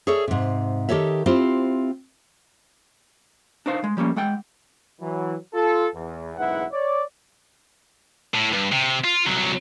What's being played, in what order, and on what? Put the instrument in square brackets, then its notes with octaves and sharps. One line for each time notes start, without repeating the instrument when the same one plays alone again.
[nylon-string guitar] G#4 A4 C#5 D5 E5
G#2 C3
D#3 G4 A4 C#5 E5
C4 E4 F4 G4 C5
[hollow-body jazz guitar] D4 D#4 C5 F5
G#3
F3 G3 A#3 C#4
G#3 F#5 G5
[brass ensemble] E3 F#3
F4 A4
E2
F#1 B1 G#2 E4 B4 F#5
C#5 D5
[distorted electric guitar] A2
G2
C3
F4
C2 F#3